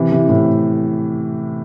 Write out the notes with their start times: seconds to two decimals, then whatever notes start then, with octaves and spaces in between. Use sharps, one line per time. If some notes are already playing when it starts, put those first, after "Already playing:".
Already playing: C3 E3
0.12 C3 E3
0.29 A2 C3